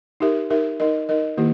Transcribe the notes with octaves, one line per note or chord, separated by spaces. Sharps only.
D#4 G4 A#4 E5
D#4 G4 A#4 E5
D#4 A#4 D#5
D#4 A#4 D#5
D#3 A#3 E4 G4